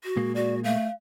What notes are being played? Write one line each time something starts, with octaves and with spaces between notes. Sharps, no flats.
F#4
A#2 G#3 A#3
F#4 D5
A3 F5